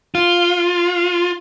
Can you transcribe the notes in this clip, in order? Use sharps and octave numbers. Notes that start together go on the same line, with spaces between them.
F4